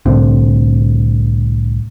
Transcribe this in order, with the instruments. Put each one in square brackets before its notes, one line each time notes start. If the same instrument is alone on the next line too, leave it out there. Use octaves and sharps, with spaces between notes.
[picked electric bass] C2 A2 D3 C4